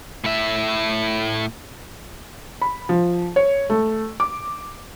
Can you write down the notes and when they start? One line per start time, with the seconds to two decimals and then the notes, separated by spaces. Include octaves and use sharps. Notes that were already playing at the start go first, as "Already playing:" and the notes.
0.24 A2 E5
2.61 B5
2.89 F3
3.36 C#5
3.70 A3
4.20 D6